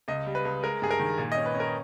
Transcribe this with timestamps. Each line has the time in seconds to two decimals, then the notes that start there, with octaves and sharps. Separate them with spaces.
0.08 C#2 D#5
0.27 G3
0.35 B4
0.45 C#2
0.63 G#3 A#4
0.82 G2 G#4
0.91 A#4
0.99 D#3
1.18 A#2
1.32 C#4 D#5
1.46 B4
1.55 C#4
1.60 A#4